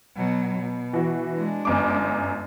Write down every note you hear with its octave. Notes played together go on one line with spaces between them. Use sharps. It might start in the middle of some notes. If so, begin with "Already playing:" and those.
B2 F#3
B2
E3 F#4
G#3 D4
G1 F#2 D6